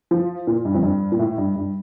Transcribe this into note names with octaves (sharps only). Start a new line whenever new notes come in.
F3
A#2
G2
F2
G2
A#2
A2
G2
G2